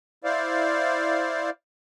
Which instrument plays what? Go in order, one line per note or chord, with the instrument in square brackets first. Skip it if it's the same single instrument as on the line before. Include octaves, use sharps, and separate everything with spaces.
[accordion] E4 C5 D5 F5